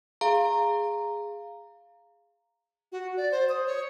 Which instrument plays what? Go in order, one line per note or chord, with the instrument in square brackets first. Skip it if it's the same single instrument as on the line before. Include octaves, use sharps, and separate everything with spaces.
[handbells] G#4 F5 A#5
[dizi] F#4
D5
C5
D#6
C#5